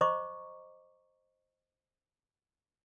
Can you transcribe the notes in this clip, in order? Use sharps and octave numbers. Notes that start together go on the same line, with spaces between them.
C5 D#5 A#5 C#6 D6